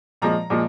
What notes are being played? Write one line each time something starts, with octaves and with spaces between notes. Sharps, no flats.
A#2 F3 G#3 A#5
A#2 F3 G#3